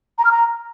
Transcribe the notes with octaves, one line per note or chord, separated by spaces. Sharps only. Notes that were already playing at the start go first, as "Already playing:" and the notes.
A#5
F6
A#5